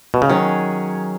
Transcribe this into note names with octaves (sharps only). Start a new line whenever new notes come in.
B2
C#3
D#3 F#3 C#4 G#4